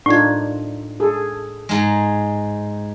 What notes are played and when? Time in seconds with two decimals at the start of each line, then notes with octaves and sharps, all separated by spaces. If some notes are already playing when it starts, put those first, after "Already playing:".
0.06 A2 D4 D#4 F4 G#6
1.00 G#4 A4
1.69 G#2 G#3